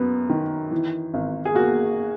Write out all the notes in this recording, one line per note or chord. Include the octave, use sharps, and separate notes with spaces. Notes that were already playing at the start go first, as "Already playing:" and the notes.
Already playing: F#2 B3
D#3
E3
G#1
G#4
A#3 F#4